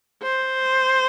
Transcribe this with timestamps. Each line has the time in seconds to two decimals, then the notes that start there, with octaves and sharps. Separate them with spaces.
0.22 C5